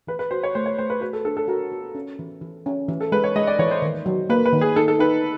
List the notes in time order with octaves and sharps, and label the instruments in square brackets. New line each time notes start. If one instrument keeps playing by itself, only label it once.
[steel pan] E3 [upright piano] B4
[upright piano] B4
[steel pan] F#4 [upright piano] C5
[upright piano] C#5
[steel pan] A3 [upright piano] C5
[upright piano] C#5
[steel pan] A3 [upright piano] C5
[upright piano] B4
[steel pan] F#4 [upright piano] B4
[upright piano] A4
[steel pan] D4 [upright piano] A4
[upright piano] A4
[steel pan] F#4 [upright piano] A#4
[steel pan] F#4
C#4
E3
E3
C#4
E3
[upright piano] A4
[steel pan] G#3 [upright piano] B4
[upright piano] C#5
[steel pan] G#3 [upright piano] D#5
[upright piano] D5
[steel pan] E3 [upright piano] C#5
[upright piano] C5
[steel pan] D#3
F#3
[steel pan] A#3 [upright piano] B4
[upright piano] B4
[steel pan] D#3
[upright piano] G#4
[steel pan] D#4 [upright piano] A4
[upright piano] A4
[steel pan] D#4 [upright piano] B4